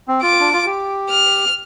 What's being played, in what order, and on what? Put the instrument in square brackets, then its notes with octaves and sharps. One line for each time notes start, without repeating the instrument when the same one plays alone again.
[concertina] C4
[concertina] F4 [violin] D6
[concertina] D4
F4
G4
[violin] F6